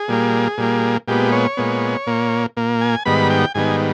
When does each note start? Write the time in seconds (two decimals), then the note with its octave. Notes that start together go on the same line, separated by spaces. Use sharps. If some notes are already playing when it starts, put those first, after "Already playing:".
Already playing: G#4
0.08 A#2 G3 A#3
0.58 A#2 G3 A#3
1.08 A#2 G#3 B3 G4
1.32 C#5
1.57 A#2 G#3 B3
2.07 A#2 A#3
2.57 A#2 A#3
2.81 G#5
3.05 G#2 D#3 G3 B3 B5
3.30 G5
3.55 G#2 D#3 G3 B3 G#5